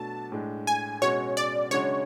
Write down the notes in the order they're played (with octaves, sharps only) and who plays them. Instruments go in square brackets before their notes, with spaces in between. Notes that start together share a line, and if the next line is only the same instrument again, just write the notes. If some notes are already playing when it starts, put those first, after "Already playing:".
Already playing: [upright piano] B2 F#3 A3 D4 F#4 [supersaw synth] A5
[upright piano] A2 G#3 D4
[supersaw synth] G#5
[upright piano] B2 G#3 C#4 F#4 [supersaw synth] C#5
[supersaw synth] D5
[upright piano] C#3 G#3 D4 F#4 [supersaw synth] C#5